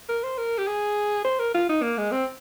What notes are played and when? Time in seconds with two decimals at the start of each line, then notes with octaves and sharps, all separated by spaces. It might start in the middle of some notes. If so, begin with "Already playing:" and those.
0.09 A#4
0.23 C5
0.38 A#4
0.58 G4
0.67 G#4
1.25 C5
1.39 A#4
1.54 F4
1.69 D#4
1.82 A#3
1.98 G#3
2.12 C4